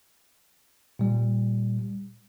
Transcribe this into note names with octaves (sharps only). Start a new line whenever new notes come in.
A#2 G3